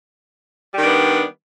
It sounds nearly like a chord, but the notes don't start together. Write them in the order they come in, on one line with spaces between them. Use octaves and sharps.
G3 D#3 D4 B3